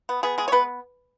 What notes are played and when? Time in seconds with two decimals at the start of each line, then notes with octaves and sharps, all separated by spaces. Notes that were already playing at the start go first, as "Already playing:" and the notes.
0.09 B3
0.23 B3 G#4
0.38 G#3 G#4
0.48 C#5
0.52 B3 B4